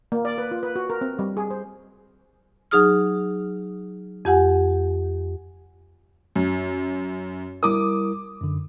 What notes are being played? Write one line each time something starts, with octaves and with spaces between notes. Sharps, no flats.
A#3
D5
B4
F4
B4
F#4
A#4
C4
G3
G#4
C5
F#3 D#4 G#4 D#6 F6
F2 G4 F#5 G#5
F#2
G3 E4 A#4 D6 D#6
F#2 D3